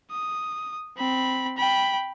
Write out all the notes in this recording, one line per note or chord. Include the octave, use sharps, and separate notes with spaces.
D#6
C4 B5
G5 B5